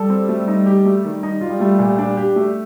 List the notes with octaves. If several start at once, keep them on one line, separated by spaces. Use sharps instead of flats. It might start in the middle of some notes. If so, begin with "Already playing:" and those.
Already playing: G3 A4
C4
A3
D#4
G4
A3
D#3
D#4
G3 F4
A3
A#2
D4
G4
A3